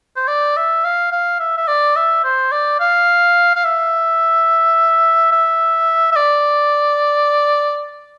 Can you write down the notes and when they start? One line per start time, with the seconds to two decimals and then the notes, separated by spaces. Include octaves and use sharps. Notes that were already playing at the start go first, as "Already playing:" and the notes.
0.17 C5
0.28 D5
0.57 E5
0.85 F5
1.12 F5
1.40 E5
1.57 E5
1.68 D5
1.96 E5
2.24 C5
2.52 D5
2.80 F5
3.55 F5
3.64 E5
5.32 E5
6.12 E5
6.16 D5